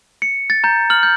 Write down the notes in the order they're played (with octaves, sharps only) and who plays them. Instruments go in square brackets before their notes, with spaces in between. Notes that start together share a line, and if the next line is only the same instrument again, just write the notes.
[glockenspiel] C#7
A6
A#5 G6
F6 F#7
G6